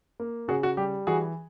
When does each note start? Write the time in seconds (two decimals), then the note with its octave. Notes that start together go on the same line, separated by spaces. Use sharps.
0.20 A#3
0.48 C#3 F#4 G#4
0.63 F#4
0.77 G3 G4
1.07 E3 F#4 G#4